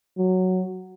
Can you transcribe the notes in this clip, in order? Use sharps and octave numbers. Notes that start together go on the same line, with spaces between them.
F#3